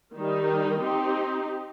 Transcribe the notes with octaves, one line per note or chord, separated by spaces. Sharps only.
D#3 G3 D#4
C4 D#4 G4